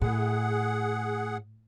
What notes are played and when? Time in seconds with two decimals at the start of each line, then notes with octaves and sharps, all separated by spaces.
0.02 A2 G#4 F#5